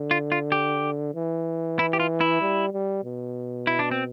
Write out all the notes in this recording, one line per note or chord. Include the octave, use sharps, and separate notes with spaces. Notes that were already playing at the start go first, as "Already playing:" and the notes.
Already playing: D3
F4
F4
G4
E3
E4
G4
F4
E4
G3
G3
B2
E4
D4
C4